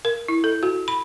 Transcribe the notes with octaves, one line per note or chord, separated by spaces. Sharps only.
A#4
E4
A4
F#4
B5